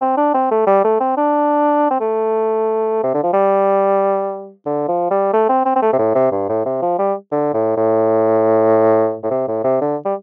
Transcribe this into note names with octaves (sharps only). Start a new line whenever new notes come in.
C4
D4
C4
A3
G3
A3
C4
D4
C4
A3
C3
D3
F3
G3
D3
F3
G3
A3
C4
C4
C4
A3
C3
A2
C3
G2
A2
C3
F3
G3
D3
A2
A2
A2
C3
A2
C3
D3
G3